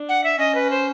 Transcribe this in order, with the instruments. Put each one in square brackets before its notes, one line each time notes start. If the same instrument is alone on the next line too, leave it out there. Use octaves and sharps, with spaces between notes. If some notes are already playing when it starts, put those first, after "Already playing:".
Already playing: [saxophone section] D4
[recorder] F#5
E5
[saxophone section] C#4 [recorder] D#5
[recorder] B4
C5